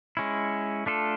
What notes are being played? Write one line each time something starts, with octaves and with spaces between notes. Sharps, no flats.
G#3 C#4 E4
A3 D4 F4 A4